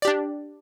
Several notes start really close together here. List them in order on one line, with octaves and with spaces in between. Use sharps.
D5 G4 D4